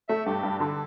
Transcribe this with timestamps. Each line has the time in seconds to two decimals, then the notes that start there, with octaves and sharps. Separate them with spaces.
0.09 A3 E5
0.26 G2 G4
0.43 G2
0.60 D3 A4